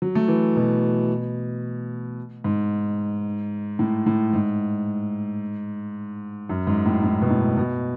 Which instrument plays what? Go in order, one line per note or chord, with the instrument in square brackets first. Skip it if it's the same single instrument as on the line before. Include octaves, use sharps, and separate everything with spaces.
[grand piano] F#3
A3
E3
B2
G#2
A2
A2
G#2
F#2
G#2
A2
A2
B2
A2
B2